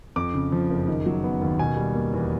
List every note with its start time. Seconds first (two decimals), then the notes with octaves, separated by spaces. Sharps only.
0.16 F2 D6
0.34 C#3
0.52 F3
0.70 F#1
0.88 D#3
1.06 F#3
1.24 B3
1.42 D#2
1.59 B2 G#5
1.77 G3
1.95 A#3
2.14 E2